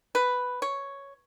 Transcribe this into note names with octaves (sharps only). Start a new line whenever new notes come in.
B4
C#5